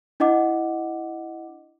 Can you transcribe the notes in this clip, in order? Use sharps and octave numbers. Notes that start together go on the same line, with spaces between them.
D4 E4 D#5 F#5 D6